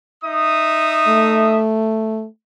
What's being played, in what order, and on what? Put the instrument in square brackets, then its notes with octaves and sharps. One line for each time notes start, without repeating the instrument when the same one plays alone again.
[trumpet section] D#4 E5 D#6
[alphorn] A3